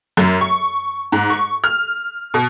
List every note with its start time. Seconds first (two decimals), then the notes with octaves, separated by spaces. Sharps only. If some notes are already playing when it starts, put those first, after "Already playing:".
0.17 F#2
0.41 C#6
1.12 G#2
1.30 C#6
1.64 F6
2.34 B2